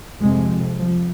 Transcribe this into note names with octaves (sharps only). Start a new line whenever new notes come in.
F2 C3 G#3
F3